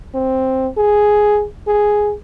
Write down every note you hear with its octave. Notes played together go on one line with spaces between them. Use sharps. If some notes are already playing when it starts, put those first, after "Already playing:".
C4
G#4
G#4